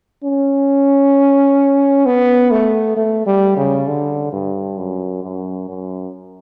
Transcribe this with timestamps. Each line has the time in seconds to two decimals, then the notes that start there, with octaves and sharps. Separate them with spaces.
0.24 C#4
2.06 B3
2.51 A3
2.97 A3
3.27 G3
3.57 C#3
3.87 D3
4.33 G2
4.78 F#2
5.24 F#2
5.69 F#2